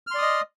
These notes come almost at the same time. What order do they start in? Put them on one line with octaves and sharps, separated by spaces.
F6 C6 D5 D#6 D#5